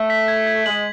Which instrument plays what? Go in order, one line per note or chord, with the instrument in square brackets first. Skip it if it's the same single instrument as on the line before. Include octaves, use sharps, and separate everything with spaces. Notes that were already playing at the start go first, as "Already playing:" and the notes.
Already playing: [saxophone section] A3
[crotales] B6
G#6
G#6
[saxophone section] G#3 [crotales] F#7